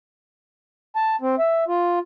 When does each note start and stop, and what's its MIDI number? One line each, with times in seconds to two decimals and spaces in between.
0.96 1.16 81
1.21 1.35 60
1.39 1.64 76
1.68 1.99 65